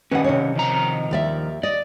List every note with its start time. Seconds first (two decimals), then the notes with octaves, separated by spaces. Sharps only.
0.11 D#3 C#4 B4 F#5
0.24 C3 C#5
0.56 D#3 F3 A#5
1.11 D#2 D5 E5
1.63 D5 D#5